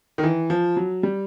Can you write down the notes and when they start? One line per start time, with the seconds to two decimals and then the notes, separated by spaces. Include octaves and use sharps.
0.18 D#3
0.23 E3
0.50 F3
0.77 F#3
1.03 G3